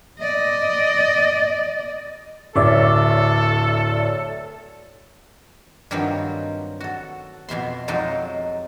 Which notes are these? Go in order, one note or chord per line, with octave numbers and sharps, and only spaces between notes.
D5 D#5
D1 A4 C#5 D5 E5
G2 D#3 F3 F#3 C4
F#4 A4
F2 B2 E5 C6
F2 F#3 G#3 D#4 A4 F5